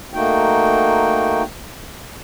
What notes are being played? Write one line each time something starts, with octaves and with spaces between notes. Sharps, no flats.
A3 A#3 D#4 F#4 G5